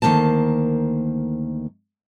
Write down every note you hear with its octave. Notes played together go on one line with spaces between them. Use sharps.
D2 D#3 F3 A#3 C5 A5